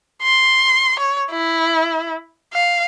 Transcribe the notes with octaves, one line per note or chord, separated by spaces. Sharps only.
C6
C#5
E4
F5